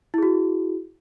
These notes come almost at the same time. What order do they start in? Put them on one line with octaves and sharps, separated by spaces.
E4 G#4 F#4